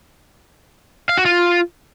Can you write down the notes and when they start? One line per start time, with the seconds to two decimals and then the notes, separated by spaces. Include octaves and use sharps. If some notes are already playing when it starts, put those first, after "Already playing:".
1.09 F5
1.17 F#4
1.26 F4